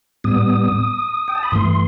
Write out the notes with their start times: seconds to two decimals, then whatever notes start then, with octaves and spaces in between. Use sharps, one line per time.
0.24 A2 G3 B3 D#6
1.28 G5
1.35 A5
1.43 B5
1.51 G2 E3 A3 C6